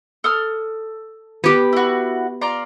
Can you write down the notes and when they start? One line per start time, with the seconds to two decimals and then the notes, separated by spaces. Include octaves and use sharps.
0.24 A4 D#6 F6
1.44 B3 G4
1.73 E4 F#4
2.41 F4 D5 A#5